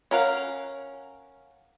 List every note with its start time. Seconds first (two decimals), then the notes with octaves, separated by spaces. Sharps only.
0.11 C#4 A#4 F5 F#5